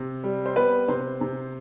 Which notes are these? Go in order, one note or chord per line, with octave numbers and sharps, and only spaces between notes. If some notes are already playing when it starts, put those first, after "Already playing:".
Already playing: C3
G3
C5
B3 B4
C3 C5
C3